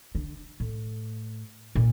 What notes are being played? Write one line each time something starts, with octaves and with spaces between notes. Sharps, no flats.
D3
A2
A#2